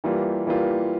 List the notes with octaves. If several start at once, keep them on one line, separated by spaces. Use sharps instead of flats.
E3 G3 A#3 F4
E3 G3 A#3 F4